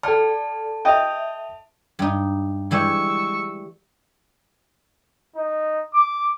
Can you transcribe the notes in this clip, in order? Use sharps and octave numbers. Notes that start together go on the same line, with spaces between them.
A4 D5 A5 F6
D#5 E5 G5 F7
G2 D#4
E3 G3 G#3 C#6 E6
D#4
D6